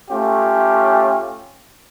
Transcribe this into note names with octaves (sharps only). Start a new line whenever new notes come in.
A3 C#4 F4 G4